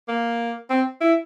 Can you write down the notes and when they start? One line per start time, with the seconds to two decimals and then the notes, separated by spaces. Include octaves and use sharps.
0.08 A#3
0.70 C4
1.01 E4